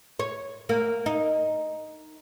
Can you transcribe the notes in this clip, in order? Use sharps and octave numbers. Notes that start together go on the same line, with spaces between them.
C#5
A#3
D#4